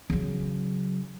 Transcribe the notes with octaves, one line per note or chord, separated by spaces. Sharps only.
C#3 F#3